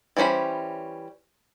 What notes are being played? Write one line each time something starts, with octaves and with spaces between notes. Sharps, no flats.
E3 G3 C#4 C5 B5